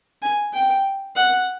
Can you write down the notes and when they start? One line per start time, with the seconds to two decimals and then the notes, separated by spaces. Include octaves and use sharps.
0.22 G#5
0.53 G5
1.16 F#5